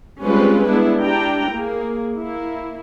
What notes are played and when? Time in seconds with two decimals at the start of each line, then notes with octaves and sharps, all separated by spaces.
0.22 G3 G#3 C4 C#4 F4 B4
0.67 G#3 B3 D4 E4
1.00 D4 E4 G4 G5 A#5
1.52 A#3 G#4
2.18 A#3 E4